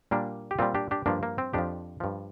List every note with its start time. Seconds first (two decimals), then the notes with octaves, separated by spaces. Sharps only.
0.11 A#2 G3 A#3 D4
0.51 G4
0.59 A#2 G3 C4 F4
0.75 D4 G4
0.91 D4 G4
1.06 G2 F3 A#3 D4
1.23 A#3
1.38 C4
1.53 F2 F3 D4 G4
2.00 G2 F3